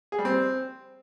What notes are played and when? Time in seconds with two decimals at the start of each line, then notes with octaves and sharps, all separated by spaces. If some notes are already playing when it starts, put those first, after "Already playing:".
0.12 G#4
0.19 G3
0.25 C4